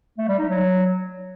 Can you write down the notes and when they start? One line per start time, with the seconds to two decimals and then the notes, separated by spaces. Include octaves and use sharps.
0.18 A3
0.28 G3
0.38 D#4
0.49 F#3